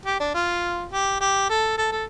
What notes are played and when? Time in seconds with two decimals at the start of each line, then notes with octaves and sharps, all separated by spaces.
0.06 G4
0.20 D4
0.34 F4
0.92 G4
1.21 G4
1.50 A4
1.78 A4
1.92 A4